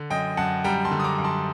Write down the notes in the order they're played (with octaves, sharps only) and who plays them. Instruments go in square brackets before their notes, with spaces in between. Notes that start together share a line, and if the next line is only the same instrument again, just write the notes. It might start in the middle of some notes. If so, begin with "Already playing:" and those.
Already playing: [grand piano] D3
F#2 D#5 G5
F#2 F#5 A5
G3 G5 A#5
A5 C6
D3
D#6
A#5 D6
F#2
A5 C6